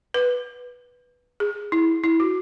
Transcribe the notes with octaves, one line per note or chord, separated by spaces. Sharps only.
B4
G#4
E4
E4
F#4